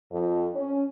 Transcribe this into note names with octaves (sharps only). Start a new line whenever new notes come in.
F2
C#4